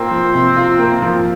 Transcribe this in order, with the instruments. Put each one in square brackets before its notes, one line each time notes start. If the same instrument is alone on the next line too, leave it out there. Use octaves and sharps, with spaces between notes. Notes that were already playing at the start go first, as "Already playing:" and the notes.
Already playing: [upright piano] A#3 F4 [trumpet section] C4
[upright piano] F3
C3
F4
A#3
F3